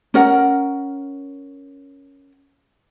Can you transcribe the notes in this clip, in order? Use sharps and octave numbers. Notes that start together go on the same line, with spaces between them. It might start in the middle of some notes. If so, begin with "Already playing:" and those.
C#4 A#4 F#5